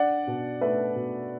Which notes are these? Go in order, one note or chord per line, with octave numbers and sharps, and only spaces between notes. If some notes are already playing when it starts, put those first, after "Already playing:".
Already playing: D4 D5 F#5
B2
A3 B4 E5
B2